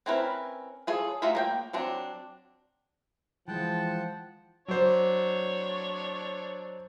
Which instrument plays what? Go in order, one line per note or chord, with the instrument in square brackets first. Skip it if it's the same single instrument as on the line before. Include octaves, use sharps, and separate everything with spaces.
[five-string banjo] C4 C#4 E4 A#4 B4
F4 G#4 A4 C#5
A3 F4 F#4 A#4 E5
A#3 D5 G5
F#3 C4 D4
[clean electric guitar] E3 G#3 [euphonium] F3 [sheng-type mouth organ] F#5 G5 A5
[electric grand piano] F#3 C5 [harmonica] D4 C#5